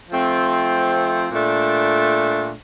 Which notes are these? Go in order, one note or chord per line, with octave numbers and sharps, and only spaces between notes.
F3 A3 C4
A#2 A3 D4